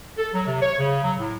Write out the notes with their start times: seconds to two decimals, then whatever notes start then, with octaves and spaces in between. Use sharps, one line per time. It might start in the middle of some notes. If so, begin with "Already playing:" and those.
0.18 A4
0.34 F#3
0.46 C3
0.62 C#5
0.79 C#3
1.03 F#3
1.19 A2